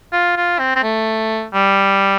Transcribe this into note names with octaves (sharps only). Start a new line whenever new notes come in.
F4
F4
C4
C4
A3
G3